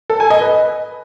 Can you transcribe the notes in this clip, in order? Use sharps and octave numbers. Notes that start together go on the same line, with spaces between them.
A4
G#5
D#5
B4